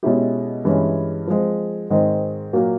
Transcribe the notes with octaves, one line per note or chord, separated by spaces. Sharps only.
B2 G#3 C#4 E4 G4
G2 E3 G#3 C#4 E4
F3 G#3 C4
G#2 D#3 G#3 C4
A#2 F#3 A#3